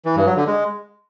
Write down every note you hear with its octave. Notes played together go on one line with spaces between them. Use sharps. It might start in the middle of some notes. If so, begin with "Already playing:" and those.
E3
G2
F#3
D3
G#3